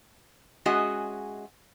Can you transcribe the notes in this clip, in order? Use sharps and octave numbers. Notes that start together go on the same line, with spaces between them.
G#3 C#4 F#4 G#4 D#5 E5